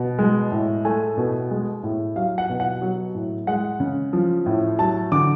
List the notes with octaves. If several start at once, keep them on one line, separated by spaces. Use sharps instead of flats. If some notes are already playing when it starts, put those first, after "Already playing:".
Already playing: B2
G#3
A2
A3 G#5
B2
G#3
A2
F#3 F5
F#5
B2
F#5
F#3
A2
G#3 F#5
C#3
F3
A2
F#3 A5
D3 D6